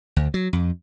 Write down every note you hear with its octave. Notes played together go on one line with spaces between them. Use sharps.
D2
F#3
F2